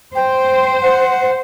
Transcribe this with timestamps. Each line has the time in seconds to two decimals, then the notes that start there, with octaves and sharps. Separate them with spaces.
0.15 C5 G5
0.82 F#5